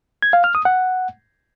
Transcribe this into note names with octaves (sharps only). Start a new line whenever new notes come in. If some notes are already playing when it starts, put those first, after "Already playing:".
G#6
F5
F6
D#6
F#5